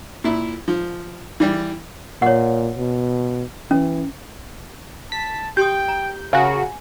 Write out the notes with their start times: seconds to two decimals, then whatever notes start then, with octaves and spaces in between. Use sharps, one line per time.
0.24 A#2 E4
0.68 F3
1.40 E3 G3
2.22 A#2 C#5 F#5
2.77 B2
3.71 E3 C#4
5.12 A5 B6
5.57 G4 G5 C6 D#6 G6
5.88 A#5
6.33 C#3 F#4 A#4 G#5